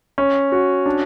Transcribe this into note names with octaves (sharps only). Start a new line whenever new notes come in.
C#4
F#4
D4